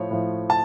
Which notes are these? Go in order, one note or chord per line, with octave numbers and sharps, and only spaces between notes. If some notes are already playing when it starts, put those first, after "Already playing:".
Already playing: A2 F3 C#5
A2 F3
A5